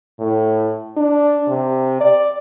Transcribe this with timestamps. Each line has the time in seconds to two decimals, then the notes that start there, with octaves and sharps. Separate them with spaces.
0.19 A2
0.97 D4
1.48 C3
2.00 D5